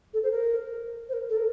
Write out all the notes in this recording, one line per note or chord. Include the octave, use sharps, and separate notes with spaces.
A4
C5
A#4
C5
A#4
A4
A#4